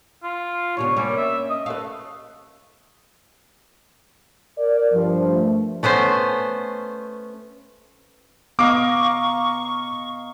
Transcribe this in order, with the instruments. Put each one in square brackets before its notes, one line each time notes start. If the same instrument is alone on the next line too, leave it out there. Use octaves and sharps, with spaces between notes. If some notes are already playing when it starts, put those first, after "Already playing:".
[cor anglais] F4
[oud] D2 C3 B3 [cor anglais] C#5
[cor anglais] G3 [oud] A#3 C#4
[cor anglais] E5
D#5
[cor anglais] A3 [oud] B4 F5
[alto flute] A#4 [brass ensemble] D5
[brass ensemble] G2 F3
[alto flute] A3
[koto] A3 B3 C#4 C5
[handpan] B3 [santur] D#5 F5 A#5 [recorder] C#6 [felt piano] D6